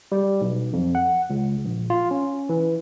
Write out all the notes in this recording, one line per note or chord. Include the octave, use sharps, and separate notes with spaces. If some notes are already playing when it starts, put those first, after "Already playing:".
G3
B1
F2
F#5
C#2
A#1
F4
C#4
E3